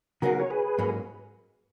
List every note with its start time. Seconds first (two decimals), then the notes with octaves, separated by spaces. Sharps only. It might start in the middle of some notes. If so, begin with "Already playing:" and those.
0.22 C#3 F#3 B3 D#4 F#4 G#4 A#4
0.40 C#5
0.50 G#4 B4
0.79 G#2 F#3 A#3 C#4